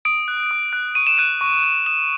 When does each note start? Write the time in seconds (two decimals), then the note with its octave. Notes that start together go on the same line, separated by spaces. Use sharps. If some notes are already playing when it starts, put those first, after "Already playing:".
0.05 D#6 D7
0.28 F#6
0.51 D#6
0.73 F#6
0.95 C#6 D#7
1.07 E7
1.18 F#6 D#7
1.41 C#6
1.64 F#6
1.86 D#6 E7